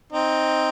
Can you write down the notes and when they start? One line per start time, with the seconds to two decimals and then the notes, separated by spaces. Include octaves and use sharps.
0.12 C4 D#4